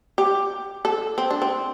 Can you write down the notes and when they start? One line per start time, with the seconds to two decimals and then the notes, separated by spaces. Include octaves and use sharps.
0.18 G4
0.85 A4
1.18 C4
1.31 D4
1.42 C4